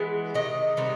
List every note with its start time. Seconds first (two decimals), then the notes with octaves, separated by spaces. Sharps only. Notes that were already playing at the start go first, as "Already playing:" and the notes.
Already playing: E3 G#3 B3
0.34 C3 D#3 D#5
0.77 C3 D#3 G3 B3